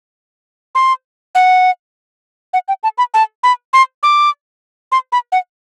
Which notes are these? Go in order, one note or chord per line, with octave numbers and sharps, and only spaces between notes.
C6
F#5
F#5
G5
A5
B5
A5
B5
C6
D6
C6
B5
F#5